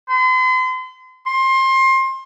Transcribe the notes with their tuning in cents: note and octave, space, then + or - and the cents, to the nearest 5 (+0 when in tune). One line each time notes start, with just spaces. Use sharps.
C6 -40
C6 +25